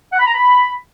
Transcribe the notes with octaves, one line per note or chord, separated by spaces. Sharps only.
F#5
B5
A#5
B5